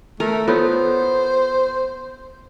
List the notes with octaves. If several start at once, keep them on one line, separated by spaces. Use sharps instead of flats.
A3 A#4
B3 F4 A4 C5 C#5